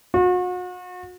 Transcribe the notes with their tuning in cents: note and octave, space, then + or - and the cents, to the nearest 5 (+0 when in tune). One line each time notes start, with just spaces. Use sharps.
F#4 -40